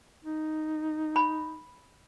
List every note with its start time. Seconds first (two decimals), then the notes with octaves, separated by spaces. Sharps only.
0.25 D#4
1.16 B5